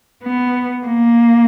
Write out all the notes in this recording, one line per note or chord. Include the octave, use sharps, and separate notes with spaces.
B3
A#3